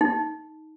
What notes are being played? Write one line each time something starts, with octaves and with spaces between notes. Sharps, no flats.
D#4